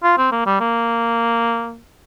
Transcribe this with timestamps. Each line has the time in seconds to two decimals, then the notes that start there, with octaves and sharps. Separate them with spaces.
0.03 F4
0.18 C4
0.32 A#3
0.46 G3
0.60 A#3